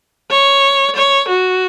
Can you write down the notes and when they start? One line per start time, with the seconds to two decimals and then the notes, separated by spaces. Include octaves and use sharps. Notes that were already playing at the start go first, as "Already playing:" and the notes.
0.31 C#5
0.96 C#5
1.28 F#4